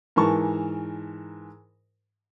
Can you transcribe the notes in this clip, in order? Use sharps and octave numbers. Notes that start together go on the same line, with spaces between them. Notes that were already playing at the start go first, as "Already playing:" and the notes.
G#2 E3 A#4 A5 C#6